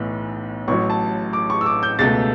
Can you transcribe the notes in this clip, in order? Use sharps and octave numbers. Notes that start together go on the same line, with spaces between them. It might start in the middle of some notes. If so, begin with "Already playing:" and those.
Already playing: B1 A2 E3 B3
A1 A2 F#3 C#6
A5
D6
C#6
E6
D6
G6
C#2 B2 A3 A6